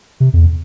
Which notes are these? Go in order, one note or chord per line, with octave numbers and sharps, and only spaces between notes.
C3
F2
E2